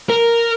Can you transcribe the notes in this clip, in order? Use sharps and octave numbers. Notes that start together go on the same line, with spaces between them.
A#4